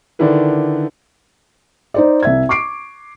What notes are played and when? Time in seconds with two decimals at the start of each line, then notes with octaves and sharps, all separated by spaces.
0.19 D3 D#3 D4 E4 B4
1.94 D#4 C5 D5
2.23 C2 E5 G#6
2.49 C#6 D6 C7 D7